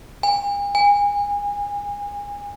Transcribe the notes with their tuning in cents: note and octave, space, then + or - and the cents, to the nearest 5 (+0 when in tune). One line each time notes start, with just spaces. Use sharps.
G#5 -45
G#5 -30